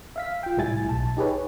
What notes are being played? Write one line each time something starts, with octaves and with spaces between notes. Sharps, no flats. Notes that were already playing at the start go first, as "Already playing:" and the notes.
E5 F5 B6
F4 G5
C2 A2 G3 E4 G#5 A6
B1 A5
D#4 G4 G#4 B4 C#5